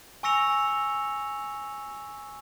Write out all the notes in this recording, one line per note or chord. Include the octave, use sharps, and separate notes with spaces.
G#5 C#6 E6 A#6 C#7 F7